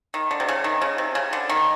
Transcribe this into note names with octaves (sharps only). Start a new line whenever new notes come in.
D#3
D3
C3
C#3
D#3
C#3
C3
C#3
D3
D#3